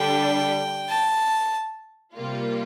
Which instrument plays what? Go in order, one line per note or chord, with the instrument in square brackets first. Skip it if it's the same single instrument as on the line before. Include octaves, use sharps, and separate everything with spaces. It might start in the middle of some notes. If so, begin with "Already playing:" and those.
Already playing: [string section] D3 G3 D4 [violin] G5
[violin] A5
[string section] C3 G3 A#3 F4